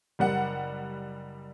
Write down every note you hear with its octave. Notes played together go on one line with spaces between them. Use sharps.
F#1 G3 F#5